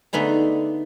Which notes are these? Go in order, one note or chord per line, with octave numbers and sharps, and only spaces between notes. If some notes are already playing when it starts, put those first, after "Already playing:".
D3 A3 B3 D#4 G#4